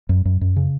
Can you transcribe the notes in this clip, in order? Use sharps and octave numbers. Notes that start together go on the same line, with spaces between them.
F#2
F#2
F#2
C#3